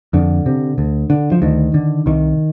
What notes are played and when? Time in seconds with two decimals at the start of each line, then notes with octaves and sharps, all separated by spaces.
0.13 F2 D3
0.46 C3
0.78 D2
1.10 D3
1.32 F3
1.42 D2 D#3
1.74 D3
2.06 C2 D#3